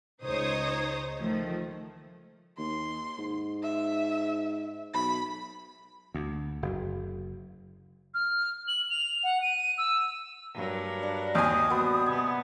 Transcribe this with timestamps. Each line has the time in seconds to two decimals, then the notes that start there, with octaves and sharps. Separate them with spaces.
0.24 C#2 D#4 C5 C#5 D#6
1.20 D#3 F3 A3
2.58 D#2 C6
3.18 G#2
3.63 E5
4.94 B1 B5
6.14 D2
6.62 F#1
8.14 F6
8.68 F#7
8.90 F7
9.24 F#5
9.42 D#7
9.78 E6
10.54 G2 F#3 A#4
11.03 D4
11.35 D#2 G5 G#5 D#6
11.70 G3 B3 F#4 C5
12.06 C3 B3 G#5